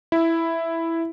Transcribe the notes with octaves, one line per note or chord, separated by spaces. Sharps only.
E4